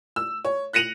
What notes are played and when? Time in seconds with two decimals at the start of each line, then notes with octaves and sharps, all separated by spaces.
0.16 E6
0.45 C#5
0.73 F#6 A#6 C#7 D#7 F7 F#7